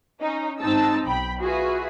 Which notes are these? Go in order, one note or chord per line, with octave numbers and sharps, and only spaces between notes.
C#4 D#4
G#2 C4 D#4 A5 E6
B1 G5 B5
F4 F#4 G#4 B4 E5